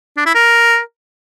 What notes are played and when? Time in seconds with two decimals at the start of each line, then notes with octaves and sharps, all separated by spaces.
0.17 D4
0.26 E4
0.35 A#4